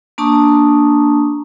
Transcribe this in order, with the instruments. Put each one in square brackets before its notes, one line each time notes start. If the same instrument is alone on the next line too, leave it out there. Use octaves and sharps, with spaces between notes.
[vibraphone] A#3 D4 A5 A#5 C#6 D#6